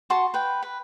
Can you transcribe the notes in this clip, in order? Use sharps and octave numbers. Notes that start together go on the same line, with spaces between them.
F#4 A5 C6 C#6
B4 G5
B4